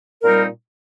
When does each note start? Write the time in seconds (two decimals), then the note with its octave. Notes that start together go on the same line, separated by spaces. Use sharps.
0.22 A#2 G3 C4 D#4 A#4